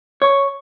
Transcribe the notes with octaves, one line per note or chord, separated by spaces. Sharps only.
C#5